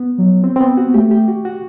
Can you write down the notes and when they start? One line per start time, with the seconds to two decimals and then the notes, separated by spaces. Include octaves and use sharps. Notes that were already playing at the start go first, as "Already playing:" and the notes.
Already playing: B3
0.18 F#3
0.44 C4
0.56 C4
0.61 B3
0.77 F#4
0.87 B3
0.94 A3 G4
1.11 G4
1.28 F#4
1.45 F#4